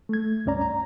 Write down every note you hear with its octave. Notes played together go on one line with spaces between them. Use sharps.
A3 G#6
C#2 G2 C#4 D5 A#5
A#5